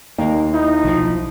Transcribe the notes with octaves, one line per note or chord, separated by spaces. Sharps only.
D#2 A#3 D#4
D#4 E4
B1 F3